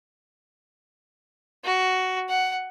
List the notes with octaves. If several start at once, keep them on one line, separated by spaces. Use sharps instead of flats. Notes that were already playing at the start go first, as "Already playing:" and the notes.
F#4
F#5